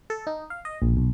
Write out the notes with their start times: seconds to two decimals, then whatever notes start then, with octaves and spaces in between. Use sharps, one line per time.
0.10 A4
0.27 D#4
0.50 F5
0.65 D#5
0.82 A#1
0.97 B1